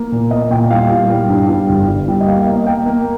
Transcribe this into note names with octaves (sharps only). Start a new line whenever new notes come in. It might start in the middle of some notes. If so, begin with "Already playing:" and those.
Already playing: A#3
A#2
A#3 D#5
A#2 G5
G3 F5
G3
G3
G2
G3
G1
G3
G3
D#5
A#3 F5
F5
A#3
D#5
A#3 G5
A#3